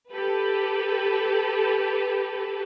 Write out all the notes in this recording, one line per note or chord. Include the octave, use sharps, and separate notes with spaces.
G4 A4 B4